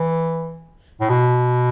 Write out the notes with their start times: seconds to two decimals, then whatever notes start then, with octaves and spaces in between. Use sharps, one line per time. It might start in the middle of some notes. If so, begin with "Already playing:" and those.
Already playing: E3
1.01 A2
1.09 B2